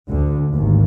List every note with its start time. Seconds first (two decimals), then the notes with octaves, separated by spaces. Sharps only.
0.11 D2 D3
0.52 G#1 D#2